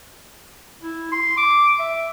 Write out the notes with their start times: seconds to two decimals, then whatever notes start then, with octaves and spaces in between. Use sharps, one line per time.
0.82 E4
1.12 C6
1.37 D6
1.79 E5